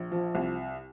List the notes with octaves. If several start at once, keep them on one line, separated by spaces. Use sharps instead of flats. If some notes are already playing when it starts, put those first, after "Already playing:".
Already playing: A#1
F3
C2